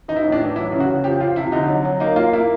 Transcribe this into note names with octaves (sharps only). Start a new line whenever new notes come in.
E3 D#4
E4
A2 D#4
D4
E3
F#3 E4
C#3
F#4
C#3
F3 G4
F3 F4
C3 E4
D3 D#4
F#3
F#3
A#3 D#4
A#3 F4
A#3 E4